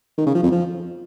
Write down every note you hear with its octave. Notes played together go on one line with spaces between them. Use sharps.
D#3
C#3
F3
F2
F3